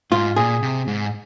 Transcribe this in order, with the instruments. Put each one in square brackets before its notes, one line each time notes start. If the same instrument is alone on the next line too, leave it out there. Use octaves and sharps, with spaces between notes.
[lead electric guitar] G#2 [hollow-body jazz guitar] F4
[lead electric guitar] A#2 [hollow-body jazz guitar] G#4
[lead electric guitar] C3
G#2